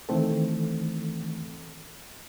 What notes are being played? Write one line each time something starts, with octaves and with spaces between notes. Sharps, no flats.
D#3 E3 A3 C4 A4